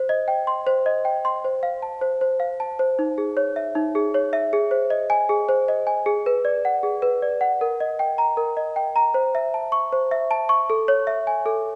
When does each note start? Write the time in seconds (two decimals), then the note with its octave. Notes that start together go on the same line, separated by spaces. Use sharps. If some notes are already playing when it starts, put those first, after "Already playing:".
Already playing: C5
0.09 D#5
0.28 G5
0.47 C6
0.67 C5
0.86 D#5
1.05 G5
1.25 C6
1.45 C5
1.63 F5
1.82 A5
2.01 C5
2.21 C5
2.40 F5
2.60 A5
2.79 C5
2.99 D#4
3.18 G#4
3.37 C#5
3.56 E5
3.75 D#4
3.95 G#4
4.14 C#5
4.33 E5
4.53 G#4
4.71 C5
4.90 D#5
5.10 G#5
5.29 G#4
5.49 C5
5.68 D#5
5.87 G#5
6.06 G#4
6.26 B4
6.45 D5
6.65 F#5
6.83 G#4
7.02 B4
7.22 D5
7.41 F#5
7.61 A#4
7.80 D#5
7.99 G5
8.18 A#5
8.37 A#4
8.57 D#5
8.76 G5
8.96 A#5
9.14 C5
9.35 E5
9.54 A5
9.72 C#6
9.93 C5
10.11 E5
10.31 A5
10.49 C#6
10.70 A4
10.88 C#5
11.07 E5
11.27 G#5
11.46 A4